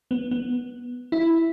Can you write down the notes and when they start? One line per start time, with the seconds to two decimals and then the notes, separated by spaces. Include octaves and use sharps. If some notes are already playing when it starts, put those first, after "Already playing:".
0.11 B3
0.31 B3
1.12 E4